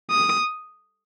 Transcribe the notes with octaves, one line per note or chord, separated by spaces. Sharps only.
D#6